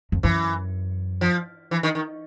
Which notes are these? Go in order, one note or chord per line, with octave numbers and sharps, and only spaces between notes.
F2
F#2 E3
F3
E3
D#3
D#3